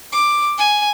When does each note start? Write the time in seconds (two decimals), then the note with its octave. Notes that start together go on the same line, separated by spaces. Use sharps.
0.12 D6
0.58 G#5